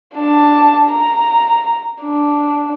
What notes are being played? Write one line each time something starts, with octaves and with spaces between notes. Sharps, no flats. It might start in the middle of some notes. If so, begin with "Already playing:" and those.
D4 A5
A#5
D4